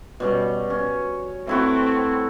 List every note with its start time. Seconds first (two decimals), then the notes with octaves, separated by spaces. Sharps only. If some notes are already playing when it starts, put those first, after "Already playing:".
0.20 B2 G3 C#4
0.70 C#4
1.47 A3 C4 E4 F#4